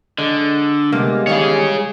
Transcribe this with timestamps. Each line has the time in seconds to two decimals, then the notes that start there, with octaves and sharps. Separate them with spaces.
0.18 D3 G#3
0.92 C3 G3 G#3 A#3 B3
1.27 D#3 E3 G#4 C#5 F5